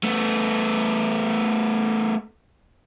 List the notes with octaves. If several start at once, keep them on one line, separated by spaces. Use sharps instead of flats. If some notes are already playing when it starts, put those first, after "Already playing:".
A3 B3